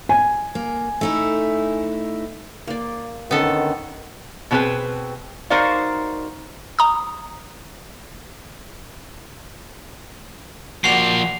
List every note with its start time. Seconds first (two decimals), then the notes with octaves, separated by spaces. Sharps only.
0.09 G#5
0.55 A#3
1.01 A3 D#4 E4
2.68 A#3 D5
3.31 D3 D#3 B3 C#4 A4
4.51 B2 D3 C4 G#4 B4 G5
5.50 D#4 F#4 A#4 C5 D5 F5
6.79 A#5 D#6
10.84 F3 A#3 F#4 D5 C7 F7